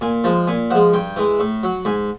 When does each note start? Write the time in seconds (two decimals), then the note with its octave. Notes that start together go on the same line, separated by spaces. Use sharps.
0.01 A#2 G#5
0.24 F3 G#3 A5
0.47 A#2 G#5
0.70 F3 G#3 F#5
0.94 G2 G5
1.16 E3 G#3
1.40 A2
1.63 F#3
1.85 G#2 G#5